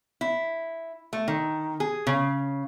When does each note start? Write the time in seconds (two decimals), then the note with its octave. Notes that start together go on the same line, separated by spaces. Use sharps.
0.21 E4
1.13 A3
1.28 D#3
1.80 G#4
2.07 C#3